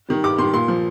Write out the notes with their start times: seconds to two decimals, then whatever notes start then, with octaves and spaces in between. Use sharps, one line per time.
0.08 D#3 G3
0.23 G2 D6
0.38 D#3 G3 C6
0.53 A#2 C6
0.68 F3